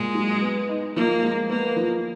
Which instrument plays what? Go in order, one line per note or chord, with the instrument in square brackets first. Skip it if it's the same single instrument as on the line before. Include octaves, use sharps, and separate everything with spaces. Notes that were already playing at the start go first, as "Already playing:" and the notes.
Already playing: [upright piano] A#2 [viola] G#3
[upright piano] F#3
B3
D#4
[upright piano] F3 [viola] A#3
[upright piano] G#3
[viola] A#3 [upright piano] B3
[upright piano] F3